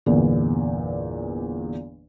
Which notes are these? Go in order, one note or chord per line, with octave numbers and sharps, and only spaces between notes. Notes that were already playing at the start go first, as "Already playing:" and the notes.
G1 E2 A#2